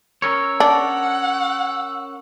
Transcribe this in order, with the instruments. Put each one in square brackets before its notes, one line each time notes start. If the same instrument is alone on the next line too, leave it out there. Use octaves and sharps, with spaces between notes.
[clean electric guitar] C#4 A#4 C#5 [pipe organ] E6
[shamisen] D4 [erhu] F#5